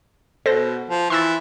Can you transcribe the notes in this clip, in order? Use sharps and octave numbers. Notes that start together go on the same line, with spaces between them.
B2 A4 C5 A#6
F3
E3 C6 E6 A6